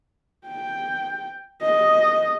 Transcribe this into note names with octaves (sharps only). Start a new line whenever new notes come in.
G5
D#5